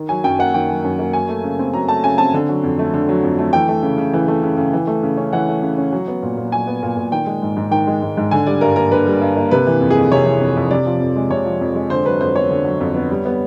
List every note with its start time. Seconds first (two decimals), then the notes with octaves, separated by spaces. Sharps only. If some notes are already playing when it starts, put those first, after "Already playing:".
Already playing: D#3
0.09 F#3 G#5
0.24 F#2 G5
0.39 A#3 F#5
0.54 D#3 G5
0.69 F#3
0.84 F#2
0.99 A#3
1.13 F#3 G#5
1.29 A3
1.44 C#3
1.59 C4
1.74 F#3 A#5
1.88 A3 A5
2.04 C#3 G#5
2.18 C4 A5
2.34 D3
2.49 F#3
2.63 F2
2.79 A3
2.94 D3
3.09 F#3
3.23 F2
3.39 A3
3.53 E3 G5
3.69 A3
3.83 C#3
3.97 C#3
4.13 E3
4.28 A3
4.43 C#3
4.57 C#3
4.73 E3
4.87 A3
5.03 C#3
5.17 C#4
5.33 E3 F#5
5.48 A3
5.62 C#3
5.78 C#4
5.92 F#3
6.07 B3
6.23 A#2
6.37 A#2
6.52 F#3 G#5
6.67 B3
6.83 A#2
6.97 A#2
7.12 D#3 G5
7.26 G#3
7.42 G#2
7.57 G#2
7.71 D#3 G5
7.87 G#3
8.02 G#2
8.17 G#2
8.31 D3 G#5
8.47 G3 D5
8.61 G2 A#4
8.76 A#3 A#4
8.91 D3 B4
9.07 G3
9.21 G2
9.37 A#3
9.51 C3 B4
9.67 E3
9.81 F2
9.91 G#4
9.96 F2
10.12 C3 C#5
10.26 E3
10.41 F2
10.57 F2
10.71 C3 D5
10.86 F3
11.00 F2
11.16 G#3
11.31 C3 C#5
11.45 F3
11.61 F2
11.75 G#3
11.90 D3 C5
12.05 F#3 B4
12.21 F2 C5
12.35 B3 C#5
12.50 D3
12.65 F#3
12.80 F2
12.95 B3
13.11 G3
13.25 B3